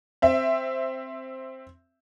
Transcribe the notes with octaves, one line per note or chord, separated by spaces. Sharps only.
C4 E5